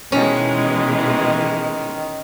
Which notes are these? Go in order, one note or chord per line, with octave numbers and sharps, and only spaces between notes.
B2 D#3 E3 G#3 C#4